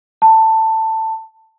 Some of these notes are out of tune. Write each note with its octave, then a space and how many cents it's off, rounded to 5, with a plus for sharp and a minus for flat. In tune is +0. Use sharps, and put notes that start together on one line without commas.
A5 +15